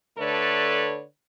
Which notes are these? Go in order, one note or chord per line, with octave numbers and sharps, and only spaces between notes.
D3 A3 A4 B4 C#5 D5